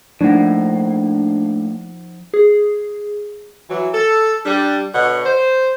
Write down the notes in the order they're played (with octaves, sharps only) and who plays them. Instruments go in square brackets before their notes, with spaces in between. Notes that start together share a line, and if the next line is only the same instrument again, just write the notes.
[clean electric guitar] A2 A#3 [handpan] F3 D#4 F#5 [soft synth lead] D4
[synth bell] G#4
[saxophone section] E3 F#3
A4
G3 D4
B2 D3 C#5 F#5
C5